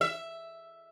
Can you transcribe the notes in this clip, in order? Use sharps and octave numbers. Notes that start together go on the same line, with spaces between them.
E5